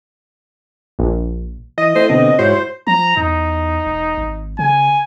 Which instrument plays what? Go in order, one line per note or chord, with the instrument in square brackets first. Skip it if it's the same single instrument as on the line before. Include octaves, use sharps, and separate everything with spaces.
[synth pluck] A#1
[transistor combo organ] E3 [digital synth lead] D#5
[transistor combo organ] A3 E4 [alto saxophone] C5
[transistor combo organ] B2 D3 [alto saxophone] C4
[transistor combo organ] G#2 F#4 C#5 [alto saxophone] E4 [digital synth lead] C5
[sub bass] F3 [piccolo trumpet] A#5
[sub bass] E2 [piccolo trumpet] D#4
[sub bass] E1
G#1
[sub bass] C#3 [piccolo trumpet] G#5